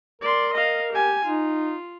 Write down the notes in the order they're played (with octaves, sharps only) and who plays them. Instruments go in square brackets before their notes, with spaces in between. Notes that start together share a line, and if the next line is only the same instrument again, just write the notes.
[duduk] A#4 [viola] D5 C6
[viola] D#5 F5
G4 G#5
[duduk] D#4 [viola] F4